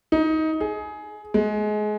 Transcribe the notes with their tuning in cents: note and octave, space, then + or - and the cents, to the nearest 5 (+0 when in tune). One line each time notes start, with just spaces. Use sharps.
D#4 +20
G#4 +20
G#3 +25